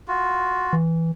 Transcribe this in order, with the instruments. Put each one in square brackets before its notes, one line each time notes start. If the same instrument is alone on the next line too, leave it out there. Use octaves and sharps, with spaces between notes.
[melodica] F4 F#4
[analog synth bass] E3